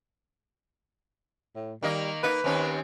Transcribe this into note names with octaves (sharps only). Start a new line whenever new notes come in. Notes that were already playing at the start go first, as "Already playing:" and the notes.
A2
D#3 G3 A#3 D#5
A#3 D#4 B4
D#2 C4 C#4